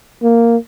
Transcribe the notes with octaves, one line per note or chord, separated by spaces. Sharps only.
A#3